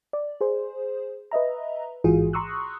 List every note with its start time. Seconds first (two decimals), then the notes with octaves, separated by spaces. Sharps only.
0.13 D5
0.41 G#4 C5
1.31 B4 D#5 E5 A#5
2.04 A1 G#2 E3 F4 F#4 G#4
2.33 A#5 C6 C#6 D#6 E6 F#6